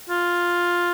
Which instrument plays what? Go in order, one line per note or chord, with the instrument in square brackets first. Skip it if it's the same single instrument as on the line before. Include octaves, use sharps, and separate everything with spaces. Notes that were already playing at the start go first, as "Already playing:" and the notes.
[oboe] F4